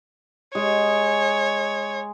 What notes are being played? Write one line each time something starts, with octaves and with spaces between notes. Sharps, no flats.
G#3 G#4 C#5